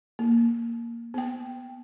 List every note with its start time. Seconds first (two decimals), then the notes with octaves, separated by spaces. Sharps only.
0.19 A#3
1.14 B3 G5